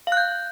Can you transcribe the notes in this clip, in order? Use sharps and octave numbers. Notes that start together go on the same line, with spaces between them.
F5
F#6
G6